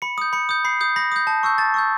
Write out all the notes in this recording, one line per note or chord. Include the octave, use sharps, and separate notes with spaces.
B5 C#7
D#6 G6
B5 C#7
D#6 G6
B5 C7
D#6 G6
B5 A#6
D#6 G6
A5
C#6 E6 G6
A5 A6
C#6 E6 G6